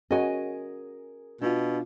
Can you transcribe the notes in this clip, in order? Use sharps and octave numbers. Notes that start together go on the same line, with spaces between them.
C#4 F#4 G#4 A#4 D#5 G#5
B2 D4 F4